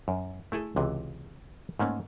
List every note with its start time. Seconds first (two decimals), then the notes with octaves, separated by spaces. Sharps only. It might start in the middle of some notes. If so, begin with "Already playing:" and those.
0.08 F#2
0.52 A3 E4 G#4 A4
0.76 C#2 C3 E3
1.79 G#2 A3 A#3 C#4